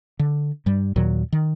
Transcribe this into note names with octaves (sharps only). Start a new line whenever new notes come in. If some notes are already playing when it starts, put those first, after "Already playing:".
D3
G2 G3
D#2 A#2 D#3 F#3
D#3